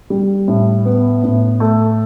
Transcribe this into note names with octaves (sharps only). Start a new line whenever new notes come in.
G3
A2
B3
A2
A3